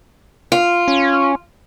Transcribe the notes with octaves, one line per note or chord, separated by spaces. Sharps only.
F4
C#4